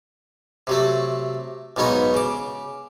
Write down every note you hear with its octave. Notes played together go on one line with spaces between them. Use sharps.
C3 F#3 A3
B1 G#2 B3 D#4 C#5
C#3 D6